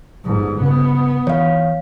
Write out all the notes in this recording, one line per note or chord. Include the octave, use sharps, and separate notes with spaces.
G1 G#2
C#3 B3
E3 C#5 F5